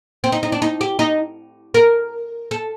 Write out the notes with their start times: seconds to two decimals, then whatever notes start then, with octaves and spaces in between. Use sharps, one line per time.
0.24 C4
0.32 D#4
0.43 D#4
0.52 D4
0.62 D#4
0.81 G4
0.99 D#4
1.74 A#4
2.51 A4